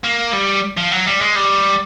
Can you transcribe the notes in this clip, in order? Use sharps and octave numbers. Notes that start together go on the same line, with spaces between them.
A#3
G3
F3
F#3
G3
G#3
G3